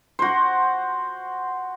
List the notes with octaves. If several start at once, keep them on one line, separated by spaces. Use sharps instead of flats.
F#4 C5